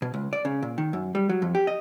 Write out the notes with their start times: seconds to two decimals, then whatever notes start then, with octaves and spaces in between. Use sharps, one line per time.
0.02 B2
0.14 C#2
0.33 D5
0.45 C#3
0.63 A#2
0.78 D#3
0.93 F#2
1.15 G3
1.29 F#3
1.42 F2
1.55 G4
1.67 D#5